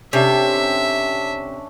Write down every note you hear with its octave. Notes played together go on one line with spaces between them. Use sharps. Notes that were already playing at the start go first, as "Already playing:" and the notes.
C3 C#4 D4 A4 E5